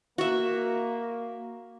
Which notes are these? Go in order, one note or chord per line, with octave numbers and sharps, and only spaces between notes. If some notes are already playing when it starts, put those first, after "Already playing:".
A#3 F#4 E5